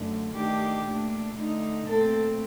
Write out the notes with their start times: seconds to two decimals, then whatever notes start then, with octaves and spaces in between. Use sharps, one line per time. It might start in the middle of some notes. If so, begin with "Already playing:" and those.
Already playing: F#2 D3 A3
0.34 D#3 A3 D4 G4
0.85 A#2 A3 D4
1.36 D3 A3 D#4
1.86 A#2 A3 C4 A4